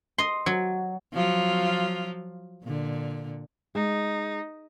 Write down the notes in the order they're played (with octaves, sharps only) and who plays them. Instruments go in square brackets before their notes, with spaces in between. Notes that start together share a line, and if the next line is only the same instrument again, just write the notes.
[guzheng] D#5 C6
F#3
[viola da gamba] F3 F#3 F4
A#2 D3
[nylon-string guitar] G#3 [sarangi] D#4